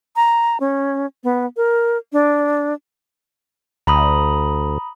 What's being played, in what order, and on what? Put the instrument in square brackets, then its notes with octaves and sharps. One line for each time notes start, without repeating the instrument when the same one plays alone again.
[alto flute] A#5
C#4
B3
A#4
D4
[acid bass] D2 [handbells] A#5 B5 D#6